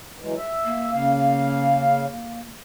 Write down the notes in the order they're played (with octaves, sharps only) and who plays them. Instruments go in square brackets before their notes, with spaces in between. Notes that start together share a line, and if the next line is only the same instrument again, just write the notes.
[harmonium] E3 F#3 G#3
E5
[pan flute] A#3
[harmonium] C#3 F5